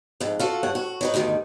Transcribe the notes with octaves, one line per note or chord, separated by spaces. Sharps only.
F2 G#2
F4 F#4 A4
G2 C#5 F#5
F#4
F#3 D#4 B4
D2 G2 B2 D#3